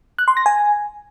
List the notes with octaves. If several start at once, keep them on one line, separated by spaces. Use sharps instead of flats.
F#6
C6
A#6
G#5